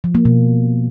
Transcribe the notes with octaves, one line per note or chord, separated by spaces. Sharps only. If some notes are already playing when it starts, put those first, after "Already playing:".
F3
A#3
B2